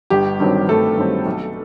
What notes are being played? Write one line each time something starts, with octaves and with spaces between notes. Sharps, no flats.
G1 G4
G2 D#3 F#3 C4
G1 A3 A4
G2 D#3 F#3 C4
B1